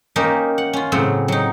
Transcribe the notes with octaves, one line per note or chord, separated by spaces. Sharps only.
A#3 C#4 D#4 G4 A#4
F#5
C#4 F4
A2 C#3 F#3 C4
F#3 D#4